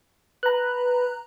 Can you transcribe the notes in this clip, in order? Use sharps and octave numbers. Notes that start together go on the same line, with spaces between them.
B4 A#5 F#6